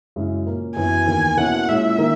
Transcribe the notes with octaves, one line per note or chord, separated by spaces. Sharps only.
F#2 C#3 G#3 C#4 E4
A#2 A#3 C#4
F#2 E3 B3 G#5
E2 D#3 A#3
B2 A#3 C#4 E4 F#5
A#2 G#3 C#4 E4 E5
D#3 A#3 D#4